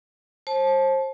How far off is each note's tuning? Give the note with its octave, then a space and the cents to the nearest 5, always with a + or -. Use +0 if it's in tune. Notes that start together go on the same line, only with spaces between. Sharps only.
C5 +35 A5 -20